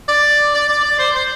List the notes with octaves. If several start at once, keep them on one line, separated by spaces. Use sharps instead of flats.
D5
D5
D5
D5
C5
C5